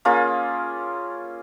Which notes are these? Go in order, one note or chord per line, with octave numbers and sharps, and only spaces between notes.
A#3 C#4 F4 G#4